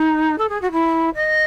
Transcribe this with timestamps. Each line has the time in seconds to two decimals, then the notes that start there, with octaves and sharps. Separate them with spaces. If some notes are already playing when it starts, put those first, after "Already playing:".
Already playing: D#4
0.38 A4
0.49 G#4
0.62 F#4
0.72 E4
1.15 D#5